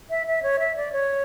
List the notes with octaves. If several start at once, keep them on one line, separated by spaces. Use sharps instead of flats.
E5
E5
C#5
E5
D5
C#5